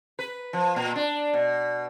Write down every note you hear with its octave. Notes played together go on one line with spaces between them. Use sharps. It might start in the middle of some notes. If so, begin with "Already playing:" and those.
B4
F3
A#2
D4
B2